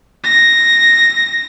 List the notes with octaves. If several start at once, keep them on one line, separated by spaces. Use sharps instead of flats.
A#6